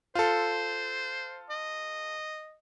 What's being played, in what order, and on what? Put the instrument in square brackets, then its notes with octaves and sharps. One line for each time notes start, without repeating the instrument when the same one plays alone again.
[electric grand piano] F4 A4 [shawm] C5
[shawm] D#5